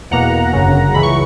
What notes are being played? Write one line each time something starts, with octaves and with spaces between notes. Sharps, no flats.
E2 B2 A#3 F#5 A#5
G1 F#2 C#3
C#2 C#3 E3 B5
C#6